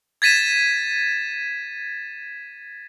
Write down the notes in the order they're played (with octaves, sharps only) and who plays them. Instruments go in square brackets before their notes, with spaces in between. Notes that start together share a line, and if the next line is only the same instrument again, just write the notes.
[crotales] G#6 A6 B6 D#7 E7